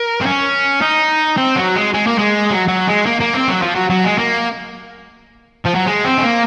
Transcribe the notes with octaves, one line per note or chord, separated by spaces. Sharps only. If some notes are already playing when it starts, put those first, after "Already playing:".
Already playing: A#4
C4
C#4
D#4
C4
F#3
G#3
G#3
A#3
G#3
F#3
F#3
G#3
A#3
A#3
C4
F#3
F3
F#3
F#3
G#3
A#3
F3
F#3
G#3
C4
G#3
A#3